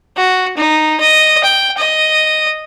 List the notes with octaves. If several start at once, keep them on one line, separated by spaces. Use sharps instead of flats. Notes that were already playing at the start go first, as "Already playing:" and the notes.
F#4
D#4
D#5
G5
D#5